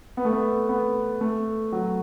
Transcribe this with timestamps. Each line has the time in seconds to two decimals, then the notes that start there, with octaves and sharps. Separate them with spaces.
0.17 B3
0.25 A3
0.32 B3
0.69 B3
1.21 A3
1.72 F#3